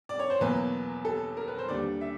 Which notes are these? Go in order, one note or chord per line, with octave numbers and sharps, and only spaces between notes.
D5
C#5
C5
E2 B2 F#3 A#3 B4
A4
A#4
B4
C5
D#2 D3 G3 D5
E5